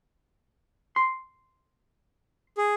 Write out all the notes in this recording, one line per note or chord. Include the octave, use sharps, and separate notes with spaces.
C6
G#4